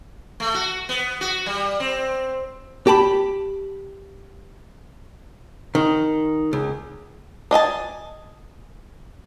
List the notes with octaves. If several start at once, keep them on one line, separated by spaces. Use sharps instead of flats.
A3
F#4
B3
F#4
G3
C4
G4 A5 B5
D#3
C#2
D4 D#5 G#5 A5